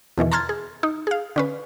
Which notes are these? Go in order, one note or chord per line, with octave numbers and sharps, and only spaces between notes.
E2 B2 D#3 E3
A5 A#5 C6 F6 G#6 A6
G#4
D#4
G#4 F5
D3 C#4 B4